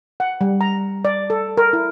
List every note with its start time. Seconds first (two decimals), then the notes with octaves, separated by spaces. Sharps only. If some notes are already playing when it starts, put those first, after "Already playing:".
0.20 F#5
0.41 G3
0.61 A#5
1.05 D5
1.30 A4
1.57 A#4
1.73 E4